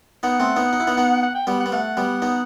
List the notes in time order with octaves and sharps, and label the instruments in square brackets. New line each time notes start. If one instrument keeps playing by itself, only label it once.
[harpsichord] B3 D#4 [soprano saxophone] F#5
[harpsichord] A3 C4
B3 D#4
D#4
E4
B3 D#4
B3 D#4
[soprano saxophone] F#5
G5
[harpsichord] G3 B3 [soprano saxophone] F#5
[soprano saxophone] F#5
[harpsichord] B3
[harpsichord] A3 [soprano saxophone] F#5
[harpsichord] G3 B3
B3 D#4